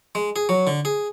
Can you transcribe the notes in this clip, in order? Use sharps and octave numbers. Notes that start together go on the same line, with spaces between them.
G#3
G#4
F#3
D3
G#4